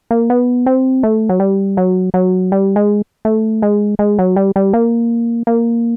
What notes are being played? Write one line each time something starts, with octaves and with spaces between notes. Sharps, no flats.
A#3
B3
C4
A3
F#3
G3
F#3
F#3
G3
G#3
A3
G#3
G#3
F#3
G3
G3
A#3
A#3